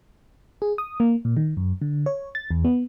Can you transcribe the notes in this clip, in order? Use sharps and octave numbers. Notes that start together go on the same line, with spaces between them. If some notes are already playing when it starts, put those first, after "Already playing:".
G#4
D#6
A#3
A#2
D#3
F#2
D3
C#5
A6
E2
B3